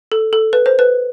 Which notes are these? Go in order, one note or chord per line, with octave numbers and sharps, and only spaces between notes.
A4
A4
B4
C5
B4